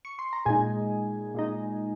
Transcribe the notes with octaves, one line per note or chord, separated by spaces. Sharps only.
C#6
C6
A#5
A#2 G#3 D#4 G#4 G#5
A#2 G#3 D#4